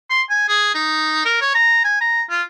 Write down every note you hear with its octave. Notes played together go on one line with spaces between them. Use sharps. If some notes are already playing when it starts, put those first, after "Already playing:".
C6
G#5
G#4
D#4
A#4
C#5
A#5
G#5
A#5
F4